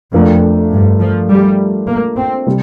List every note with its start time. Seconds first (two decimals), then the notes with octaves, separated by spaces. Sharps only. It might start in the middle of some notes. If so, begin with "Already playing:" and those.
0.13 F2 A3 D4 F4 A#4
0.72 G2
1.01 F3
1.30 G3
1.88 A#3
2.17 C4
2.46 C3 G3